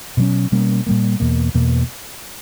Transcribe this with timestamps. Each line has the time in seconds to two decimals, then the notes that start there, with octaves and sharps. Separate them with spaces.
0.17 B2 F#3 C#4
0.52 B2 G3 A#3 C#4
0.86 A#2 G3 A#3
1.20 E2 B2 A#3
1.54 E2 B2 A#3